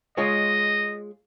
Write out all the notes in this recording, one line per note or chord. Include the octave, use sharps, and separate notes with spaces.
G#3 F4 C#5 D#5